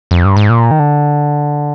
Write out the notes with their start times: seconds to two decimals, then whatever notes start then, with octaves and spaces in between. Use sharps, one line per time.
0.11 F2
0.25 G2
0.37 G#2
0.50 A#2
0.71 D#3
0.79 D3